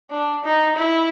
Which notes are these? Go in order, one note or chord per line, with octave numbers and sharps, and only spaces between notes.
D4
D#4
E4